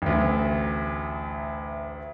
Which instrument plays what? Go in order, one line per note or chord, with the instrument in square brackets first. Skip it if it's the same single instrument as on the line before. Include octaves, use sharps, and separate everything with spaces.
[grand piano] A1 D2